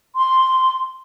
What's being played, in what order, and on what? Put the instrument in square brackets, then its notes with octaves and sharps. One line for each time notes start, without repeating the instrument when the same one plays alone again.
[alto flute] C6